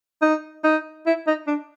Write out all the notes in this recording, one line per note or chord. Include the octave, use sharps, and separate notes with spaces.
D#4
D#4
E4
D#4
D4